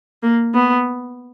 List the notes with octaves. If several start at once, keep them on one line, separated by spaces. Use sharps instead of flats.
A#3
B3